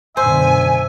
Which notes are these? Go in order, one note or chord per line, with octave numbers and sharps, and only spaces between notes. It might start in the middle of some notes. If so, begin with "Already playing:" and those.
F#2 B2 D3 C5 E5 G#5